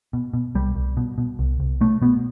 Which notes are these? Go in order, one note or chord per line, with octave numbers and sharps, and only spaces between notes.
B2
B2
C2 G3
C2
B2
B2
C2
C2
B2 A3
B2 B3